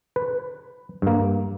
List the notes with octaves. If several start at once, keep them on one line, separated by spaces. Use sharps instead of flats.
B4
G2 A#3